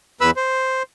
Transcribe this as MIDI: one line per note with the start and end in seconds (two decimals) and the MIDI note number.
0.21 0.31 40
0.21 0.31 71
0.21 0.31 83
0.21 0.31 88
0.36 0.83 72